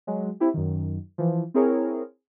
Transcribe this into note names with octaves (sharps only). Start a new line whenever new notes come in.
F#3 G#3
C4 E4 G4
F#2 D#3
E3 F3
C4 E4 G#4 A#4 C#5